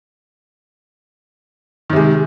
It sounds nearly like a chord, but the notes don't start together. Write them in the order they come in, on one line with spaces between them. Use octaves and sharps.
D#3 C3 G#3